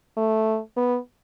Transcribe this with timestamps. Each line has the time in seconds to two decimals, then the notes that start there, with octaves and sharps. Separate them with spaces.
0.17 A3
0.77 B3